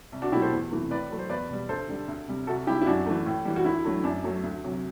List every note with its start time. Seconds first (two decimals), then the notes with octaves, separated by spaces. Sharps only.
0.12 C2
0.22 D4 F#4
0.32 B2 F#3 A3 E4 G4
0.42 A4 C5
0.52 E2
0.71 C3 E3 A3
0.91 A2 B4 D5
1.10 F#3 A3
1.19 C5
1.30 E2 B4 D5
1.49 B2 G3
1.69 D2 A4 C5
1.89 D3 G3
2.08 D2
2.28 C3 G3
2.47 C2 F#4 A4
2.67 C3 G3 E4 G4
2.82 E4
2.86 F#2 D4 F#4
3.06 E3 A3
3.26 A2
3.45 E3 G3
3.56 F#4
3.65 D2 E4
3.85 D3 F#3 A3
4.04 F#2 D4
4.24 F#3 A3
4.43 D2
4.63 C3 F#3